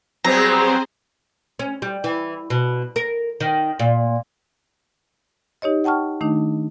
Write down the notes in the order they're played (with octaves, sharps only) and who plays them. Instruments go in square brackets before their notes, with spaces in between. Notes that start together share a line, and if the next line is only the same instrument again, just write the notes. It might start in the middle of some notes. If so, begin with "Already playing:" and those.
[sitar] F#3 G3 B3 [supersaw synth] C4 G#4 C5 [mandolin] A#5
[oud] C#4
G3
E3
B2
A#4
D#3
A#2
[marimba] D#4 G4 C#5 D#5
F#5 G5 A5 C#6 F6
D#3 A3 D4 D#4